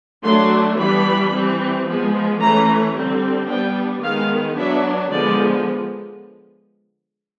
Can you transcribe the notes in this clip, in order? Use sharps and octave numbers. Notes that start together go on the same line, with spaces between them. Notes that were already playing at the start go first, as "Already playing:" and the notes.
F#3 A3 D4 C6
E3 G3 B3 D4 B5
E3 G3 C4
F3 G#3 B3
E3 A3 C#4 A#5
D3 G3 C4
G3 B3 D4 G5
D#3 G#3 B3 F5
F#3 B3 D4 E5
D3 F3 G#3 B3 D5